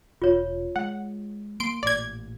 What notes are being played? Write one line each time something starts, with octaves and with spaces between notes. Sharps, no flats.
E1 F4 C#5
G#3 F#5
A#3 C6 D7
A1 A#2 D5 G#6